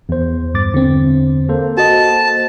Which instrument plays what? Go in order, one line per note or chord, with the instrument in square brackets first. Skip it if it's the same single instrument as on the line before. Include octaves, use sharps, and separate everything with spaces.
[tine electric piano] E2 C5
[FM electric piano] G2 D6 A6
D3 C4
[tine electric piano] A#3 A4 C5
[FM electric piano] F#4 D#5 [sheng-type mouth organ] A5